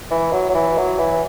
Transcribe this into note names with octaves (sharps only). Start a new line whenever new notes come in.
E3
F#3
F#3
E3
F#3
E3